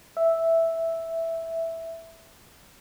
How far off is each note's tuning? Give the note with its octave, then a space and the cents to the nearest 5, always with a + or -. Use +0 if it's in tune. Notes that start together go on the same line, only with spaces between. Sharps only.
E5 +0